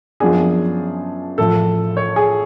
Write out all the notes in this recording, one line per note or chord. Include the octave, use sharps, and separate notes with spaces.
F#2 F3 B3 D4 G#4
A1 A2 F3 A4
C#5
G#4